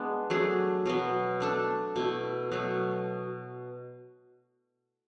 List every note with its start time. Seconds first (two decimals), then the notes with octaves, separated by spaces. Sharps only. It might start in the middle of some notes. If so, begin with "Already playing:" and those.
Already playing: G#3 B3 D4
0.30 F#3 A3 D4 G#4
0.85 B2 F#3 B3
1.40 A3 D4 A4
1.96 B2 A3 E4
2.51 B2 F#3 A3